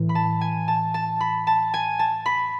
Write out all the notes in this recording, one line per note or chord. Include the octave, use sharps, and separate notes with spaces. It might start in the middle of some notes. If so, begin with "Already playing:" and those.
Already playing: A2 E3
B5
A5
G#5
A5
A5
B5
A5
G#5
A5
B5